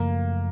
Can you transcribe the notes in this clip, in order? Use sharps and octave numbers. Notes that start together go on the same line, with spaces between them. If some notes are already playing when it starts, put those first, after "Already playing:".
Already playing: F#2 C#3 F3 A3 A#3